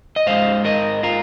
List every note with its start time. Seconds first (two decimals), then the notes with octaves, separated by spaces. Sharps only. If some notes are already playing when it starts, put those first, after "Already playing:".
0.16 D#5
0.27 G#2 G#3 C5 F5
0.65 A#4 D#5
1.03 F4 A#4